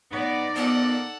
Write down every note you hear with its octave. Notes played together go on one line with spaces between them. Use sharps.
B3 D#4 D5
A#2 D#3 F3 B3 A4 F#5